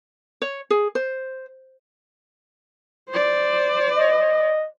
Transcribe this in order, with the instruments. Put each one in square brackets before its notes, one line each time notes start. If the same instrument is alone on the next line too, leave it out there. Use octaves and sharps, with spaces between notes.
[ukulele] C#5
G#4
C5
[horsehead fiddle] C5 D5
[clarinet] D#5